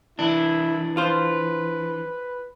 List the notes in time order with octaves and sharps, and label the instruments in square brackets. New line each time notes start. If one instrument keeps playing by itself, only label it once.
[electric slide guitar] E3 D4 [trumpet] E4
[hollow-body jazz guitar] F4 C5 [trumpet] B4